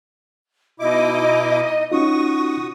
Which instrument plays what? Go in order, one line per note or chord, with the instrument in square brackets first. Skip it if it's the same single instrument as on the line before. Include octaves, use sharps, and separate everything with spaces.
[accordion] B2 E4 D6 [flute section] D#4 D#5
[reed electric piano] C#4 D#4 F4 [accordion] F#4 D#6 [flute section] C#6